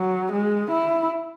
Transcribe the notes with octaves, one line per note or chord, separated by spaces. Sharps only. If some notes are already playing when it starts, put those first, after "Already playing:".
Already playing: F#3
G#3
E4